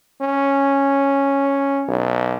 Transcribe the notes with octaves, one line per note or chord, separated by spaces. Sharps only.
C#4
B1